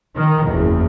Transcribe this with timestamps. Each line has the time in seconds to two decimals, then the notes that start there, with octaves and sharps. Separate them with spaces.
0.15 D#3
0.49 F#1 E2